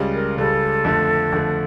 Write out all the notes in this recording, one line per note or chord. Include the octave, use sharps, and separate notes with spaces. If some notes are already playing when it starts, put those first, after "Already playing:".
Already playing: C#2 C#3 G3
A#4
C#2 C#3 G3 A4
F2 D3 A3
F2 D3 A3